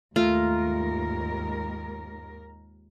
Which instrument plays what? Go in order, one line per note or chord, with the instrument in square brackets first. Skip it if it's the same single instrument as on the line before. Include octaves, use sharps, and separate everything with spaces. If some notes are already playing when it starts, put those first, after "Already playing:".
[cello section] D#2 G#2 A#4 [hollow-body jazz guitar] A3 [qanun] F4